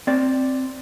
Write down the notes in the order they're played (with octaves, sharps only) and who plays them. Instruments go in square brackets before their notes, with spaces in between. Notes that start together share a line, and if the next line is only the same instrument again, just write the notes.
[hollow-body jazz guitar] C4 D5